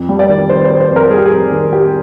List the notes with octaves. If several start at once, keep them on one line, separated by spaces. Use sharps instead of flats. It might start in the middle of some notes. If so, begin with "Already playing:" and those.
Already playing: F2
G3
D5
D#3
D#3 C5
C5
D#3
C5
F2
A#4
G3 G#4
G4
G#4
F2
D#3
G3 G4